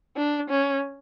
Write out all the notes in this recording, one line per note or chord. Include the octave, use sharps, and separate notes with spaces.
D4
C#4